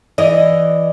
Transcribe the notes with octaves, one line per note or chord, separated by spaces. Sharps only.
E3 D5 D#5